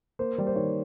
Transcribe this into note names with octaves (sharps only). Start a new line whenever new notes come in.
A#3 C5
G3
C5
D#3 C#5